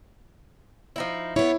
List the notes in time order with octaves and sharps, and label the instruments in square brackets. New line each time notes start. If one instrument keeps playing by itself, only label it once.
[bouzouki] F3 D#4 E4
[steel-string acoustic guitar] B3 C#5 [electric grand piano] E4